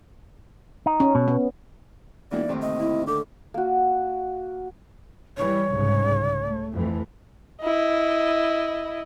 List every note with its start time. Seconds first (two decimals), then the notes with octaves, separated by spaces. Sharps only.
0.86 D#4
1.00 C#4
1.15 B2
1.28 B3
2.31 E1 E3 A#3 D#4 D5
2.49 D2 A2 C3 D#3
2.61 D#5
2.80 E4
3.07 D3 A4 D6
3.54 A#3 F#4
5.37 E3 G3 C#5
5.70 C2 G#2 C#3
6.42 A3
6.73 F2 E3 A3
7.61 E4 D#5